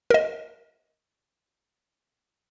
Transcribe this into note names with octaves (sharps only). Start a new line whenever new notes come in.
A#4 D#5